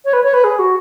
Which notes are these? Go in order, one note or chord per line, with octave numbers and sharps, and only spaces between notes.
C#5
B4
C#5
B4
G#4
F#4